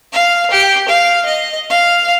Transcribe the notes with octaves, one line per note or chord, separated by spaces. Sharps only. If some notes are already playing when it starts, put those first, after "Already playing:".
F5
G4
F5
D#5
F5